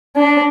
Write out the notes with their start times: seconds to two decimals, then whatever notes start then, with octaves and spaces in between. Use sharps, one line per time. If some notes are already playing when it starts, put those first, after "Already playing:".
0.16 D4